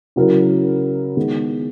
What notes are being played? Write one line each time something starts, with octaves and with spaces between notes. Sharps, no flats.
C#3 F#3 C#4 E4 A#4
D#3 G#3 B3